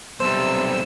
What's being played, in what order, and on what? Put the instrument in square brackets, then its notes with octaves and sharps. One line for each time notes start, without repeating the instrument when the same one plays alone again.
[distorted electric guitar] B1 G3 [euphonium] C3 [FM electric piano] C5 [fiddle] E6